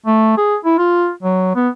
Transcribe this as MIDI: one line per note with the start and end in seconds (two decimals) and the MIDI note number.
0.06 0.35 57
0.37 0.56 68
0.65 0.77 64
0.78 1.11 65
1.23 1.55 54
1.55 1.69 59